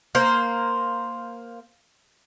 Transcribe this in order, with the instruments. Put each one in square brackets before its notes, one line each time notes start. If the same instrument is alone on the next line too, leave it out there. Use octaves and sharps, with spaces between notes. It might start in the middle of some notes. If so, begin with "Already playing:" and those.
[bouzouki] A#3 C5